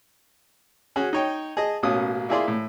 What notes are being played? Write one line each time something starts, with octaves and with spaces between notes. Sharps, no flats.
C#4 F#4 G#4
D#4 C#5 G5
G#4 D#5 A5
A1 B2 A#3 C#4 D#6
A#3 E4 F4 G#4 D5 C6
A2